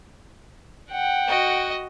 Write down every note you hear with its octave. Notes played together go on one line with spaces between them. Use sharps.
F#5 G5
F#4 D#5